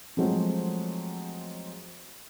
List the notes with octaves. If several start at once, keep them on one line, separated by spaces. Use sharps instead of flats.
F3 F#3 G#3 A3 C4